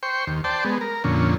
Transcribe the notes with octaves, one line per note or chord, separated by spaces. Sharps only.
C5 G5 C#6
D#2
C5 D5 G5 A5
G#3 B3
A#4
F2 A#2 D3 C#4